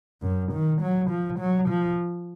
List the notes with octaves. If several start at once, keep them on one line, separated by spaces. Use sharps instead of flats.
F#2
D#3
F#3
F3
F#3
F3